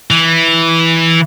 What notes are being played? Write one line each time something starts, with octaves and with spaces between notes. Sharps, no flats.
E3